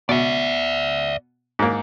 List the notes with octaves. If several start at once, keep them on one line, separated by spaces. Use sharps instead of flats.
B2 D5 E5
G#2 A#3